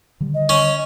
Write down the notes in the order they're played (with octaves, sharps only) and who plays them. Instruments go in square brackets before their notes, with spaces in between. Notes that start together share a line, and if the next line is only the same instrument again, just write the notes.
[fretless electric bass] D3 D#3 G3
[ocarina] D#5
[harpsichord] C#4